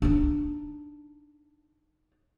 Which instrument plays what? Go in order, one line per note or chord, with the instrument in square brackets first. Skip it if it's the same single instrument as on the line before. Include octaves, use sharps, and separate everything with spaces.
[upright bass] D4 D#4